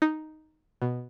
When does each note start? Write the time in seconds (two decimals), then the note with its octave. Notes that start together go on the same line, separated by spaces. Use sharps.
0.02 D#4
0.82 B2